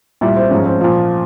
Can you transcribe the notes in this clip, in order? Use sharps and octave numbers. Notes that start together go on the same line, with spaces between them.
A#2 G3 E4
C4
G#2 F3 C#4
C4
A#2 F3